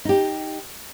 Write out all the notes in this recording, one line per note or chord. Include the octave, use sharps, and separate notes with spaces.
D#4 G4